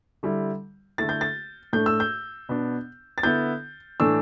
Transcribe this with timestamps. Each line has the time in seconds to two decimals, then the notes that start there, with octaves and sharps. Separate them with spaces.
0.23 D3 G3 E4
0.98 D3 A3 E4 A6
1.09 G6
1.21 A6
1.73 A2 A3 D4 G6
1.86 E6
2.00 G6
2.49 B2 B3 D4
3.18 A6
3.23 D3 B3 E4 G6
4.00 A2 E3 A3 D4 E6